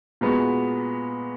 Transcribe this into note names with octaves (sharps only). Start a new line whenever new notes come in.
A#2 G#3 B3 F#4